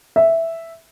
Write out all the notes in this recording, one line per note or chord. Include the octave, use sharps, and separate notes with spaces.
E5